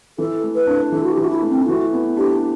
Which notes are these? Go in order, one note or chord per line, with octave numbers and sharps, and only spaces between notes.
E3 A4
A3
B4
D4
E3 A4
F#4
G4
E3
F#4
E4
A3
C4
E4
E3 F#4
B3
D4 G4